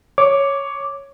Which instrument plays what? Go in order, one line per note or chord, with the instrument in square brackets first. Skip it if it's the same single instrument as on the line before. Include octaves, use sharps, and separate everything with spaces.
[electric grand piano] C#5 [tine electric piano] D6